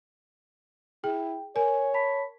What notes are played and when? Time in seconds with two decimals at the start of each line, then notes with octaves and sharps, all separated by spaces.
1.04 E4 G#4 G5
1.56 A#4 C#5 G#5
1.94 A5 B5 B6